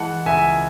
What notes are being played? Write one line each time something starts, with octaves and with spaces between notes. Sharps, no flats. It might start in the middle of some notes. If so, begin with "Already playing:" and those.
Already playing: E3 G#3 F#5 A5
C#2 E5 G#5